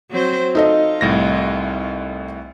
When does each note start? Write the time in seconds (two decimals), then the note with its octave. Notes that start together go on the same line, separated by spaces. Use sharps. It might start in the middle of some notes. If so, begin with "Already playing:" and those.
0.11 F#3 C4 C5
0.55 D#4 F4 A4 D#5
1.01 C2 A2 A#6